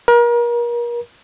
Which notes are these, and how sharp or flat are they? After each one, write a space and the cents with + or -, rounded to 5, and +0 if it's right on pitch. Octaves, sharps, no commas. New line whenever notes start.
A#4 +35